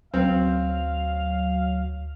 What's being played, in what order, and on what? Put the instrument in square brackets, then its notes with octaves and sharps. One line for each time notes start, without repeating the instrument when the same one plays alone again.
[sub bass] D2 [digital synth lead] F#3 [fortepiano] C4 [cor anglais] F5